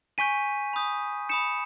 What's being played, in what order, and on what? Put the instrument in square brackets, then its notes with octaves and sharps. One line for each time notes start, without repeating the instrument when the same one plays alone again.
[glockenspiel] G#5 C#6 G6 B6 D#7
B5 D#6 G6
B5 D#6 G6 C#7 E7